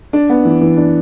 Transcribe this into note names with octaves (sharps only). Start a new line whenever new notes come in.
D4
B3
E3
E3
D4